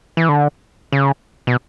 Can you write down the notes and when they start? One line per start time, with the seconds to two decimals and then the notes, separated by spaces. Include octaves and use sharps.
0.17 E3
0.29 D3
0.92 C#3
1.47 B2